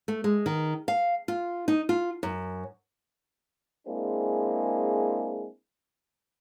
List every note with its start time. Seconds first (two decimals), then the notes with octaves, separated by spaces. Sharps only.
0.08 A3
0.24 G#3
0.46 D#3
0.88 F5
1.28 F4
1.68 D#4
1.89 F4
2.23 F#2
3.86 G#3 A#3 C4 D4 E4 G#4